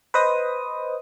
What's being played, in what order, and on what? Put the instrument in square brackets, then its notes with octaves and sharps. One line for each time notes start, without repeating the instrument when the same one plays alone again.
[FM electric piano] B4 C5 D#5 D#6